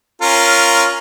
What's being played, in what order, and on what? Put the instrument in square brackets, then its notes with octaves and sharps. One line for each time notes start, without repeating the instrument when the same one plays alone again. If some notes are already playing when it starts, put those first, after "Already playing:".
[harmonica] C#4 F4 A#4